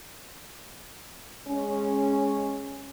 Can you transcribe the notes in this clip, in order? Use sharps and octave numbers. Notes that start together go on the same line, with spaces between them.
G#3 C#4